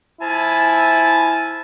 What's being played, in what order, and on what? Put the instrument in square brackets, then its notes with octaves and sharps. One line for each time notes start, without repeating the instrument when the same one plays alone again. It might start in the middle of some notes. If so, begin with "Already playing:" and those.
[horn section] F3 G#5 A5 [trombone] E4